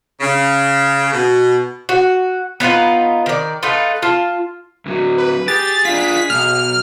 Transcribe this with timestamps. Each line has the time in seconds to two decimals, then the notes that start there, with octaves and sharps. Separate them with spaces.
0.21 C#3
1.12 B2
1.89 F#4
2.60 B3 D#4 F4 B4
3.26 D#3 D5
3.63 A3 D#4 F4 B4
4.02 F4 A5
4.86 D2 F#3
5.18 B4
5.48 G4 G#4 A6
5.85 D4 F4 B6
6.30 B1 F6